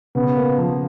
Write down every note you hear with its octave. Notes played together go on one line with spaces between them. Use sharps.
C#3 B3
A#3
F3